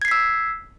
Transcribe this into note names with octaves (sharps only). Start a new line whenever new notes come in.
E6 G#6 B6 C7